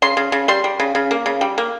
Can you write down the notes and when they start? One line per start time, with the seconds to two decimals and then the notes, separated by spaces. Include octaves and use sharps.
0.02 C#3 C6
0.17 C#3
0.32 C#3
0.48 G3 C6
0.64 G3
0.80 C#3
0.95 C#3
1.11 A#3
1.26 C#3
1.41 G3
1.58 A#3